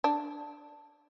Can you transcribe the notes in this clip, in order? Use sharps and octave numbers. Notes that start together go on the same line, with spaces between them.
D4